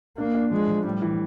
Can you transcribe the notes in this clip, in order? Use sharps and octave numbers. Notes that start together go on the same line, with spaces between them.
A#3 D4
D4
F3 G#3
F3
A2 G3
E3